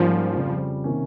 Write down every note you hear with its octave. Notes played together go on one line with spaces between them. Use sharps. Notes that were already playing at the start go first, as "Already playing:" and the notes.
Already playing: G#2 F3 G3 A#3 C#4
F2 C#3 G3
C3 D#3 A#3 C#4